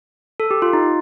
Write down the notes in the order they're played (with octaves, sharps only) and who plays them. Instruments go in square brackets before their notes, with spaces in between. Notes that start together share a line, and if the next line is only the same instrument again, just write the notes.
[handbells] A4
G4
F4
D#4